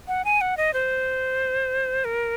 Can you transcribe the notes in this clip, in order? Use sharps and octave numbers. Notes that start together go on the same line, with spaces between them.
F#5
G#5
F#5
D#5
C5
A#4